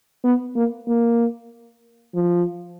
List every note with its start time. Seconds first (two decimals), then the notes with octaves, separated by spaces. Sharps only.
0.24 B3
0.56 A#3
0.88 A#3
2.14 F3